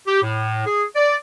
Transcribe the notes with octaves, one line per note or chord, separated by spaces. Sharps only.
G4
A2
G#4
D5